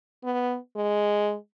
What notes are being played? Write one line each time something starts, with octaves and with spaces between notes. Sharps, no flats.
B3
G#3